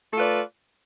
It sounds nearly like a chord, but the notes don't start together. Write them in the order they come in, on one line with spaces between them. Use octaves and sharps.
A3 A4 F4 B4 D5